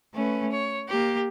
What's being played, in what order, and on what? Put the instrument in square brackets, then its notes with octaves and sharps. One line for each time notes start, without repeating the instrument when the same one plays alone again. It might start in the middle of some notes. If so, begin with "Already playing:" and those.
[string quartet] A3 C#4 B4
C#5
A#3 G4